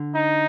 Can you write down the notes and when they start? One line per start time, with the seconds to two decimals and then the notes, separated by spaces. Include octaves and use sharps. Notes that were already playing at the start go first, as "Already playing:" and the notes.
Already playing: D3
0.15 D#4